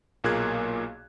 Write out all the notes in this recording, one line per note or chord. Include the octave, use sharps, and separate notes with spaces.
B1 A#2 A#3 G#4 F#6 G#6